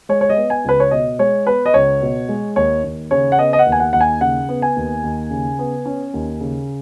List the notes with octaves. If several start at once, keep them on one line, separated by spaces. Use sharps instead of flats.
G#3 C#5
C#5
D#5
B3
G#5
C#2 B4
C#5
B2 D#5
G#3 C#5
B3 B4
D#5
C#2 C#5
B2
G#3
D#2 C#5
D#2
C#3 C#5
F#5
B3 D#5
D#5
F#5
D#2
G#5
F#5
D#2 F#5
G#5
C#3 F#5
B3
G#5
D#2
D#2
C#3
B3
C#4
D#2
C#3